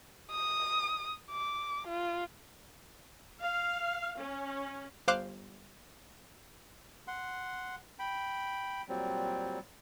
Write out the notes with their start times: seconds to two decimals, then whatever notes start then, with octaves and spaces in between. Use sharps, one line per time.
0.31 D#6
1.31 D6
1.87 F4
3.41 F5
4.19 C#4
5.08 G1 C5 F5 D6 F#6
7.08 F#5 C6
7.99 G5 B5
8.89 A#2 F#3 G3 C4